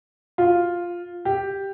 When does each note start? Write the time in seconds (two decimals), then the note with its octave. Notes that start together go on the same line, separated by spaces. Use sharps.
0.38 F4
1.25 G4